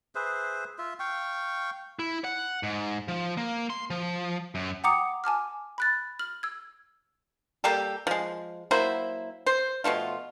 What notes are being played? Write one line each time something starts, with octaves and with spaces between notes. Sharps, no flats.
G#4 B4 C5 E5
F4 E5
F5 G5 C#6
E4
F#5
G#2
F3
A#3
C6
F3
F#2
F#5 G5 A#5 D6 D#6 C#7
G#5 A5 D6 F6
B5 F#6 A6
F6 F#7
E6 G#6
G3 A#3 G4 A4
F3 G#3
F#3 A#3 E4 C5
C5
B2 F3 A3 F4